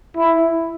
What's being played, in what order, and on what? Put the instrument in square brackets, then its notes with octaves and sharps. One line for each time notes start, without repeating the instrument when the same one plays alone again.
[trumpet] E4